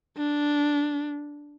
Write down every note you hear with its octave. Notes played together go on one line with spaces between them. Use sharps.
D4